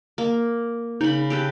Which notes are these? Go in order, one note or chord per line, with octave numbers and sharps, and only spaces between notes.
A#3
C#3 D#4 B5
G4 A4 B4